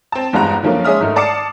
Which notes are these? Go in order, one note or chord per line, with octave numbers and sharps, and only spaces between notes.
C4 A5
E2 G2 G#3 F#4 A#5
D3 D#3 F3 F#3 A#3 C#4
G#3 C#4 G#4 E5 D#6 F6
G#2 D#3 A3 D#4
D5 A5 D6 D#6 C7 C#7